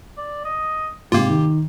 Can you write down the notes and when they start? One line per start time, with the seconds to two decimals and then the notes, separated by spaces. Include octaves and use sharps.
0.17 D5
0.45 D#5
1.12 G#2 C3 A#3 F4 G4
1.29 D#3